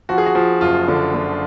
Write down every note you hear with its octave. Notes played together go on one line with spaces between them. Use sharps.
F3 F#4
G#4
F#4
F3
F#1 F4
D3
D3